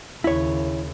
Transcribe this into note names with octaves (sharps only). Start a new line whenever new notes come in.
D#2 C#3 E4 C#5